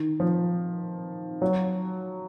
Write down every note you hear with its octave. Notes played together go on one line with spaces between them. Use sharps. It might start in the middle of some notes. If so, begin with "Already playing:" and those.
Already playing: D#3
F3
F#3